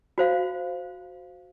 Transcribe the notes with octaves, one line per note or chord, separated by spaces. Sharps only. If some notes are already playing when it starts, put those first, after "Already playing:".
F#4 C5 F5